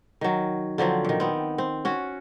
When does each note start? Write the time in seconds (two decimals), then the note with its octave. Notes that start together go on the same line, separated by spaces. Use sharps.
0.21 D#3 F#3
0.78 D3 F3 F#3 C4
1.05 A#2 D#3
1.20 B3 C4
1.58 C4
1.85 C#4 F#4